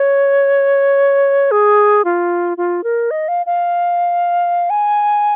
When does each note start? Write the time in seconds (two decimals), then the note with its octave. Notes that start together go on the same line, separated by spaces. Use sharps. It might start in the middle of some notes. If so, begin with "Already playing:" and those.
Already playing: C#5
1.51 G#4
2.05 F4
2.58 F4
2.84 A#4
3.11 D#5
3.28 F5
3.46 F5
4.70 G#5